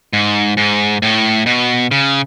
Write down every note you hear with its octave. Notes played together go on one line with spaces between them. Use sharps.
G#2
G#2
A2
B2
C#3